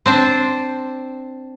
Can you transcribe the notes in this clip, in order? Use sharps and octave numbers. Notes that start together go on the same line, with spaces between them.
C4 D4 C5